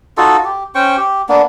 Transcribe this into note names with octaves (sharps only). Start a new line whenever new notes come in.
D#4 F4 F#4 A4
G4
C#4 C5 G5 C#6
G4
A#3 B3 D4